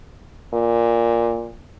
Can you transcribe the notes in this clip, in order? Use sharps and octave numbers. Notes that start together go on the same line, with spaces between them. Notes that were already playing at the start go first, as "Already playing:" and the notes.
A#2